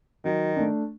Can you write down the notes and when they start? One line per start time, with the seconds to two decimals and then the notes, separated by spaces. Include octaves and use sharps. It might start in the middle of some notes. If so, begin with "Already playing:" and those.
0.25 D#3 F#3
0.56 A3 D4